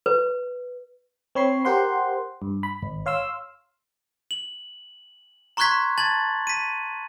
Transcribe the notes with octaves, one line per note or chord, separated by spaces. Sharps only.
B4
C4 C#5 B5 C7
G4 A#4 C5 F#5 C6
G2
B5
G#1
C#5 F5 C6 E6
F#7
A#5 C6 C#6 F#6 G#6 B6
A5 G#6 A6 F#7
B6 D#7